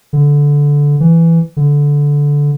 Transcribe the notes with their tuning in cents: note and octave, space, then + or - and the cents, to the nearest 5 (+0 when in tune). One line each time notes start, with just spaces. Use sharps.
D3 -15
E3 +10
D3 -15